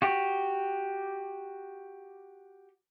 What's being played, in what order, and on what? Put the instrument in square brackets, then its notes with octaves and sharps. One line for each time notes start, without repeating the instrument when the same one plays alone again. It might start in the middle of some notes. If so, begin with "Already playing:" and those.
[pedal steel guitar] F#4 G4